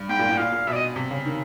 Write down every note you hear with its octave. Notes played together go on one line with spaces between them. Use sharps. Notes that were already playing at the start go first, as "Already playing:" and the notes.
Already playing: G2
G#2 G5
A#2
A2
A#2 F5
A#2
B2 E5
D5
D#5
C3
C#3
D#3